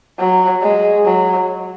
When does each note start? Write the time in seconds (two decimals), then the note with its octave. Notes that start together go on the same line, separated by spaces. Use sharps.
0.19 F#3
0.62 G#3
1.05 F#3